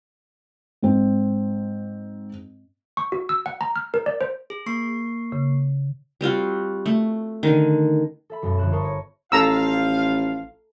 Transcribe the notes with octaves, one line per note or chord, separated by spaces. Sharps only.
G#2 C4
C#6
F#4
E6
F#5
A#5
F6
A#4
D5
C5
G#4
A#3 C#6 C7
C#3
G3 C4 F4 F#4
A3
D3 D#3
A4 E5 B5
B1 F#2 G#3
G1 F2 F#6 E7
A#4 C5 A5 B5 C#6 D#6
C#5
A1 F3 F4 A4 F5 A#5 E6